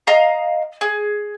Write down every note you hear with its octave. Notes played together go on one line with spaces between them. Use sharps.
D#5 F5 A#5
G#4